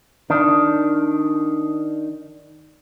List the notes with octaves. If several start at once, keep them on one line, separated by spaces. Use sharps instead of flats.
D#3 D4